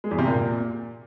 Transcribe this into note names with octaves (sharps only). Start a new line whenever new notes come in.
G#3
E2
C3
A#2